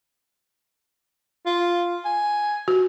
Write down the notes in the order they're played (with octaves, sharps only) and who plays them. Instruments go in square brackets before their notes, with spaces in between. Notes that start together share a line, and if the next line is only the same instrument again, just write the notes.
[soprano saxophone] F4
G#5
[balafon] F#4